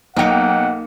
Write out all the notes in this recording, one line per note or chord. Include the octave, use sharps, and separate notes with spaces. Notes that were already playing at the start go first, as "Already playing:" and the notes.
B1 A#3 D#4 F#5 G5 C#7